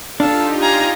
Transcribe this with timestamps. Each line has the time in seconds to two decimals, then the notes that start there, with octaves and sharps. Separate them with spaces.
0.20 D4 D#4 F4 G4 A4 F5 A5
0.61 F5 G#5 A#5